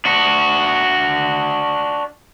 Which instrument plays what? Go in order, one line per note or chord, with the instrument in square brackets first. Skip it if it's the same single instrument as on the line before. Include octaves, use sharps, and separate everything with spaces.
[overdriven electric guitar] D4 F#4